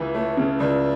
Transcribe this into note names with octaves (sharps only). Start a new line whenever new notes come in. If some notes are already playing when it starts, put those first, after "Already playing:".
Already playing: C#2 E3
A3 C#5
C#3
C#2 D5